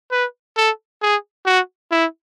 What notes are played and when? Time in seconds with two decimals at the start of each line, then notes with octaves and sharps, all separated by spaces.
0.11 B4
0.57 A4
1.02 G#4
1.46 F#4
1.91 E4